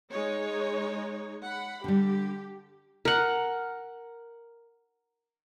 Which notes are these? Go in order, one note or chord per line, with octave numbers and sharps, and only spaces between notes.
G#3 D#4 C#5
F#5 B5
D3 G3 G4
A#4 F#5